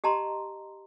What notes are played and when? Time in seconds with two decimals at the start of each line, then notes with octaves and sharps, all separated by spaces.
0.04 G4 D#5 A5 A#5 C6